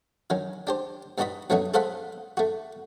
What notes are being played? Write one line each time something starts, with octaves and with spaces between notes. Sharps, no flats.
D#3 F#3 C#4
D4 G4 C5
G2 G3 D#4 F#4 D#5 B5
F#2 B2 A3 C#4 D#4 F#4
G#4 A4 C5 F5 F#5 B5
A3 F#4